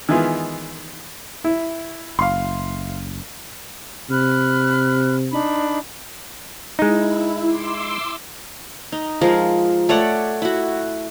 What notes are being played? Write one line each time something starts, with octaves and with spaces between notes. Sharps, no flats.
D#3 E3 G#3 B3 F4
E4
F#1 F5 C6
C3 B5 F6 F#6
D4 D#4 B5
G#3 D#4 E4
C6 D6 E6
D#4
F3 G#3 A#4
A3 C#5 D5 F#5
E4 F#4